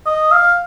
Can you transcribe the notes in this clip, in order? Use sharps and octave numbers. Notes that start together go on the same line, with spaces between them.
D#5
F5